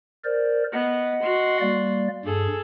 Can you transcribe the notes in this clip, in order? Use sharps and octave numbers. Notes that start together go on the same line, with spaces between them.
A#4 C5 D5
B3 D#5 F#5
F#4 C6
G3 A#3 D5
G2 G#4 A4